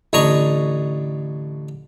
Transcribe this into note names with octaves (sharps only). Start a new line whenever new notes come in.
A1 D3 C#5 D#5 A#5 C#6